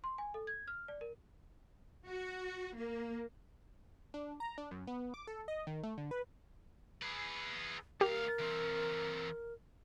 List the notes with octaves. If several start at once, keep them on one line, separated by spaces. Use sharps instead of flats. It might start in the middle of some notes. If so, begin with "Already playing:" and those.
C6
G#5
A4
G#6
F6
D5
A#4
F#4
A#3
D4
A#5
D4
F#2
B3
D6
A4
D#5
D#3
A3
D3
B4
G#4 B4
D2 G4 A#4 F5
E3 C4